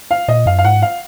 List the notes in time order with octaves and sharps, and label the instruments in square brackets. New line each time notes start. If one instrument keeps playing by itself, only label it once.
[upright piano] F5
[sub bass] A#2 [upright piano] D#5
[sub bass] F#2 [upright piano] F5
[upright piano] F5
[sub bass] G#2 [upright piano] F#5
[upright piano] F5